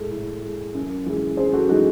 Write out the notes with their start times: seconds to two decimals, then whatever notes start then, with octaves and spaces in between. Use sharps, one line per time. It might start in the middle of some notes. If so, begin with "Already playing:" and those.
Already playing: A2 G#3 A4
0.11 A2
0.43 G#3
0.74 F#2
1.06 E3 G#3
1.37 F#2 G#4 C5
1.53 F#4 A4
1.69 E3 G#3 D#4 F#4